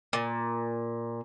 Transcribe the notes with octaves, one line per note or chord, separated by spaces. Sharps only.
A#2